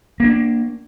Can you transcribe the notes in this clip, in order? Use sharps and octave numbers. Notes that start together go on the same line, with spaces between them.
A#3 D4